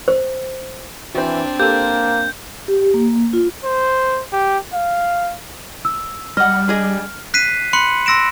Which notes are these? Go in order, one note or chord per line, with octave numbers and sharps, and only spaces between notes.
C5
E3 C4 D4 F#4 C5
A#3 G4 A4 G6
G4
A#3
F4
C5
G4
F5
E6
G3 D#5 F#5 F6
D4 G#4 D#5
F#6 B6 C7 D#7
B5 C6 F#6 C#7 F#7
C6 E6 A#6 D7 E7